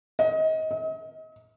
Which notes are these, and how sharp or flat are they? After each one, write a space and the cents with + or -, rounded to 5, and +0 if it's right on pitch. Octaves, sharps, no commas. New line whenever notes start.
D#5 +25
D#5 +40